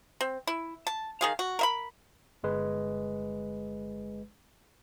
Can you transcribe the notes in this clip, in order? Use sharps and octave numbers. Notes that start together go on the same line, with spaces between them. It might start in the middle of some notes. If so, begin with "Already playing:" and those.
C4
E4
A5
D#3 G#4 F5
F#4
A#4 E5 B5
G1 G#3 B4